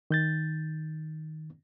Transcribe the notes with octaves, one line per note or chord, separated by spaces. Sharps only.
D#3 G6 A6